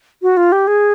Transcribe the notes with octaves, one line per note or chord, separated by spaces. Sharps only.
F#4
F4
G4
G#4